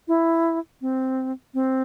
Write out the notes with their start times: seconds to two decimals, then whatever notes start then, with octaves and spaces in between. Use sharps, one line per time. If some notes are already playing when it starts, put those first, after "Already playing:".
0.08 E4
0.81 C4
1.54 C4